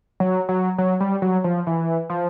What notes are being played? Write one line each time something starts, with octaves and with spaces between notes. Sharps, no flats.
F#3
F#3
F#3
G3
F#3
F3
E3
F3